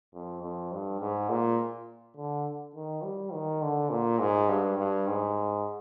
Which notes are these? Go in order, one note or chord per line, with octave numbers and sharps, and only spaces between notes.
F2
F2
G2
G#2
A#2
D3
D#3
G3
D#3
D3
A#2
G#2
G2
G2
G#2